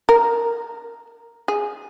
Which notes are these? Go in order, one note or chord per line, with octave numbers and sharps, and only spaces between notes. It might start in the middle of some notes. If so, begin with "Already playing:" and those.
A#4
G#4